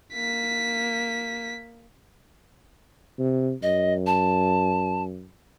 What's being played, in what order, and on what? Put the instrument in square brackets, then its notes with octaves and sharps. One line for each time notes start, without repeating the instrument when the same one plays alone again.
[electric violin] A#3 B6
[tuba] C3
[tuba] F#2 [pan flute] D#5
[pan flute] A5